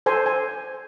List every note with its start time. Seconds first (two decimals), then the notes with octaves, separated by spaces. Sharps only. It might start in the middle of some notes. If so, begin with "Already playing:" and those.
0.06 A4 C5 G#5 C6
0.26 G#5